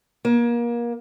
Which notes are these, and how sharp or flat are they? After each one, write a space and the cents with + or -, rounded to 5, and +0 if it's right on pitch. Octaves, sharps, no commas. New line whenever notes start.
A#3 +30